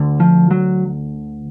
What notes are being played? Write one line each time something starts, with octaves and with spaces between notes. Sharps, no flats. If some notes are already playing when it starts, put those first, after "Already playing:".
Already playing: D2 D3
F3
F#3